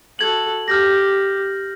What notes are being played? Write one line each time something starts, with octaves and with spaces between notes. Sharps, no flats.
F#4 A4 G#6 F#7
G4 F6 G6 A#6